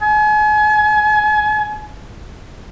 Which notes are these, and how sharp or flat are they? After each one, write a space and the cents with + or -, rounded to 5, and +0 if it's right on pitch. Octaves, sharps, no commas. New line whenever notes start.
G#5 +40